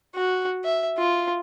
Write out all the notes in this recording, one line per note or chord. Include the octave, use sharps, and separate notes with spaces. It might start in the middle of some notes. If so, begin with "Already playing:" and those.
F#4
E5
F4